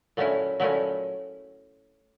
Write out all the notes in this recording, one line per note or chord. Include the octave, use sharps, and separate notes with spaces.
A#2 F#3 A3 C#4 E4
A#2 F#3 A3 C#4 E4